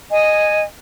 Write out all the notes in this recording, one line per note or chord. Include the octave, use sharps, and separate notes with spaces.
D#5 G#5